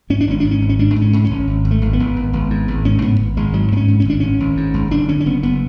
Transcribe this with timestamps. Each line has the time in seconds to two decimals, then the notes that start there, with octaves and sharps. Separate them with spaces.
0.10 G#2 C#4
0.21 D4
0.27 G#1 C#4
0.40 G#2 D4
0.51 C#4
0.62 G#1
0.69 C#4
0.79 G#2 D4
0.96 G#2
1.01 C#4
1.13 G#2
1.24 C#4
1.30 G#1
1.47 G#1
1.65 G#1
1.71 A3
1.81 G#1
1.93 B3
2.00 G#1
2.17 G#1
2.33 G#1
2.50 G#2
2.68 G#1
2.85 G#2 C#4
3.02 G#2 B3
3.20 G#1
3.37 G#1 G#3
3.53 G#2 F#3
3.72 G#2 B3
3.77 C#4
3.88 G#2
4.00 C#4
4.05 G#1 D4
4.20 G#1 C#4
4.40 G#1
4.57 G#2
4.74 G#1
4.91 F#1 D4
5.09 D3 C#4
5.20 C#4
5.26 F#1 B3
5.43 F#1 B3